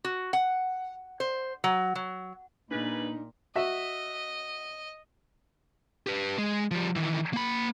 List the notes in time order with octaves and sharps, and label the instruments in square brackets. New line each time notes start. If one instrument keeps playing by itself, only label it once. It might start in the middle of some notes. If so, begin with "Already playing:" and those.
[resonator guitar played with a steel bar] F#4
F#5
C5
F#3
F#3
[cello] A#2 [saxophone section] C#3 G3 B4 [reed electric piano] D4 [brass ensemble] D#4
[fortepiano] F#4 E5 [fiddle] D#5
[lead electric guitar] G4 B4
G#3
F3 G3
D#3 E3
A#3 B5